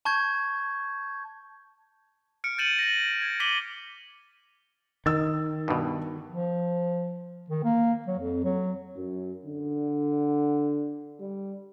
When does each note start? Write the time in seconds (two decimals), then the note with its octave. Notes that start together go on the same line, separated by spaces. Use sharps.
0.05 A5 C#6 G6 G#6
2.44 F6 C#7 D7
2.58 G6 A6 C#7 D#7 E7 F#7
2.79 A#6 F#7
3.22 G#6
3.40 D6 B6 D#7 F#7 G7
5.06 D#3 D#6 E6 A6
5.68 G2 B2
6.31 F3
7.50 D#3
7.64 A#3
8.07 F#3
8.19 F2
8.44 F#3
8.96 F#2
9.45 D3
11.20 G3